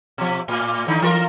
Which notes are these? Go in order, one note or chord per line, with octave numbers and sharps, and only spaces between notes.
B2 F3
A2
D3 D#3 D#4
E3 F4 A#4